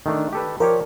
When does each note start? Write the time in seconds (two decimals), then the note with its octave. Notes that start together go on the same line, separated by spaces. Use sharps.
0.06 D#3 A3 D4
0.33 G4 A4 B4
0.60 F3 G4 A#4 C#5 D5